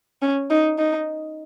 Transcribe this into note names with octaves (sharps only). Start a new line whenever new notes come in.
C#4
D#4
D#4